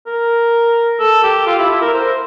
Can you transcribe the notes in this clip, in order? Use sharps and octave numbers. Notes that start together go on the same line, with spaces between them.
A#4
A4
G4
F4
E4
E4
A#4
C5